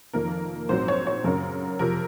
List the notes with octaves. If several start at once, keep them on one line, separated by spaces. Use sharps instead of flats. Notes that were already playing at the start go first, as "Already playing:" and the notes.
F1 F2 D#3 A#3 A#4
A#1 G#2 F#3 C4 C5
C#5
C#5
F#2 C#3 F#3 A#4
F2 C3 F3 A#4